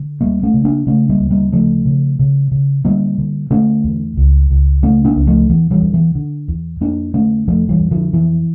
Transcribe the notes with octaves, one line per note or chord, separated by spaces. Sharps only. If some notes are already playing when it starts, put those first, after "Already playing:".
Already playing: D3
D2 G3 A#3
A3 C#4
C#3
A#3 D4
C#3 A3 C#4
G3 A#3
D2
G3 A#3
C#3 F3 A3
C#3
C#3
C#3
D3 G3 A#3
D3
D3 A3 C#4
E2
C#2
C#2
C#3 A3 C#4
A#3 D4
C#2
F3 A3
E2 E3
E3 G3
E2
E3
D3
E2
F2 A#3 D4
D3 A3 C#4
F2 F3 A3
E3 G3
F2
D3 F3
F2 E3